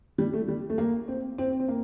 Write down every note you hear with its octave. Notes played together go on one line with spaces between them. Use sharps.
G3
A3
G3
A3
A#3
C4
C4
C4
A#3